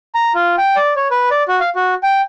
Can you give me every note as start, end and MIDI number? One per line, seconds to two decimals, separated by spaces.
0.15 0.33 82
0.35 0.56 65
0.58 0.75 79
0.76 0.94 74
0.96 1.08 73
1.11 1.29 71
1.31 1.43 74
1.48 1.60 66
1.60 1.69 77
1.75 1.94 66
2.03 2.21 79